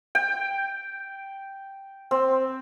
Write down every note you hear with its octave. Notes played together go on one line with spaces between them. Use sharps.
G5
C4